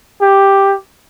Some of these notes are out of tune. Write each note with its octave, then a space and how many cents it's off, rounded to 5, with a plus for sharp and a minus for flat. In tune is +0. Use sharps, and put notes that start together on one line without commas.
G4 +5